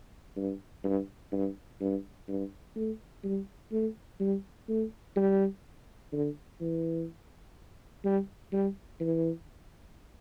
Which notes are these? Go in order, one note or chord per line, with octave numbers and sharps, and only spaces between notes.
G2
G2
G2
G2
G2
A3
G3
A3
G3
A3
G3
D3
E3
G3
G3
E3